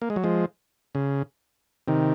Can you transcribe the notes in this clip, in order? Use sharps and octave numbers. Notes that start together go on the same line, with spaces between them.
A#3
G#3
F#3
F3 G#3
C#3
C3 D#3